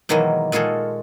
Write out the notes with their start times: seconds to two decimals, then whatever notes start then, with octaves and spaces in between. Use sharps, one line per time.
0.09 B2 D#3 E3 F#3 G#3 A#3
0.52 A#2 G#3 F4 F#4 G#4 A4